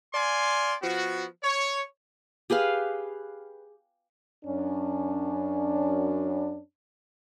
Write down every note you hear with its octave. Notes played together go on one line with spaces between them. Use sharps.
D5 F5 G#5 C6
F3 B3 F#4
C#5
G4 G#4 B4 F5
F#2 C#4 D4